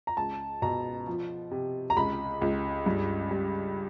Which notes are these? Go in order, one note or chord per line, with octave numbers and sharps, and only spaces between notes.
A#5
C#2 A5
B2 A#5
F3
C3
A#5
C#2 B5
C#2
G2
G3